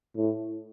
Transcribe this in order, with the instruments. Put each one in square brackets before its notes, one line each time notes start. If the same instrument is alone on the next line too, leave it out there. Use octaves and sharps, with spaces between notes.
[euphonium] A2